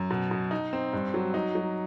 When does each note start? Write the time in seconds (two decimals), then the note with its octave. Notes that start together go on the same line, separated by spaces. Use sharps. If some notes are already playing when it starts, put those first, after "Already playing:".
Already playing: F#2
0.11 B2
0.31 B2
0.51 D#4
0.73 C4
0.93 G2
1.14 F#3
1.34 D#4
1.55 F#3